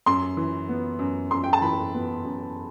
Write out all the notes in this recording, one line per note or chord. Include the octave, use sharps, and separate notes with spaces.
F#2 C6
E3
B3
F#2
F#2 C6
G5
A5
E3 B5
B3
F#2